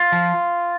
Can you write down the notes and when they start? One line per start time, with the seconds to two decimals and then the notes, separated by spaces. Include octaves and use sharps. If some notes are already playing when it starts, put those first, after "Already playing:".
Already playing: F4
0.12 F3